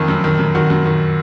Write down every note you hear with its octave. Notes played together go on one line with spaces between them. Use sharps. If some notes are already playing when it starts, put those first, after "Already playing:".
Already playing: F2 D#3
F#2
D#3
F#2
D#3 F#4
F#2
D#3